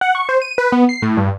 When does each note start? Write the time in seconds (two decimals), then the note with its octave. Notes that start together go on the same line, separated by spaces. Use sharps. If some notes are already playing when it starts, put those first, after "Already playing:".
0.01 F#5
0.15 C#6
0.29 C5
0.42 D#7
0.58 B4
0.72 B3
0.89 C7
1.02 A2
1.17 G2